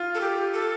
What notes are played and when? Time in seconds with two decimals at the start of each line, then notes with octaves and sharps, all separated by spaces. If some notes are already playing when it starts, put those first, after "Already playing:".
Already playing: F4
0.15 A4
0.21 G4
0.54 A4